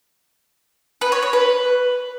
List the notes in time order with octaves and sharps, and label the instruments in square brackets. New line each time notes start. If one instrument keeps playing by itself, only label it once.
[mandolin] B4
C#5
C#5
B4